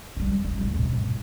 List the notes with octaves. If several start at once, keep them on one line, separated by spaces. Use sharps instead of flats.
D#3 G3
A1
D1
G#2 B2